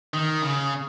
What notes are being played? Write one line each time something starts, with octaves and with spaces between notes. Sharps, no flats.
D#3
C#3